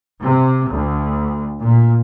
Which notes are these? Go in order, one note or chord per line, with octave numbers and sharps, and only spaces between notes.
C3
D2
A#2